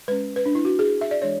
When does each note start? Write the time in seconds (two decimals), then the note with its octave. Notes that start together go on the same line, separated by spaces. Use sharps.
0.08 G#3 C#4 B4
0.36 B4
0.46 D4
0.55 E4
0.65 F#4
0.79 G#4
1.01 E5
1.11 D5
1.21 E3 G#3 D4 C#5